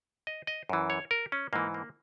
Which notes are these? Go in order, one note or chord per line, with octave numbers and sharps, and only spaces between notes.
D#5
D#5
F#2 E3
C#5
A#4
C#4
G#2 E3 A#3
A#3